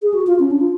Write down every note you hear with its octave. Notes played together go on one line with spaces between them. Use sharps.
G#4
F#4
F4
C#4
D4
F4